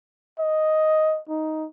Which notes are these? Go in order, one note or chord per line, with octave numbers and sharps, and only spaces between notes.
D#5
D#4